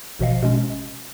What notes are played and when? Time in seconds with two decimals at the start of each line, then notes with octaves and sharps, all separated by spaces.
0.19 A1 B2 F3 D#5 F5
0.42 B2 G#3 C#4